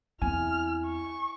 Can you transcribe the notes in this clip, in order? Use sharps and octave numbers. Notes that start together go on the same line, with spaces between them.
E2 C4 E4 G#5 F6
C#6